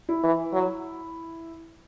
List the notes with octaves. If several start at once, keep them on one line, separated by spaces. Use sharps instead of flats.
E4
E3
F#3